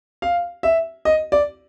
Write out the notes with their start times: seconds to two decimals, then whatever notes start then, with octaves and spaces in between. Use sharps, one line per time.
0.22 F5
0.63 E5
1.05 D#5
1.32 D5